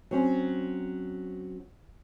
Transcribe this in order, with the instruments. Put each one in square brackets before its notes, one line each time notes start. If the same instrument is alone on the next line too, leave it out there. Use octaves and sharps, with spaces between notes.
[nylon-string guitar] F#3 C4 C#4